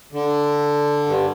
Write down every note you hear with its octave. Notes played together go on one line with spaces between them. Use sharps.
D3
G2